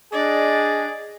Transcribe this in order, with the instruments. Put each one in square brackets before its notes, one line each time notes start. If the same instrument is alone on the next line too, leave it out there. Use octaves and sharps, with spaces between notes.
[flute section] D4 D#5 [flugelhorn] G#4 [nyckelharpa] D5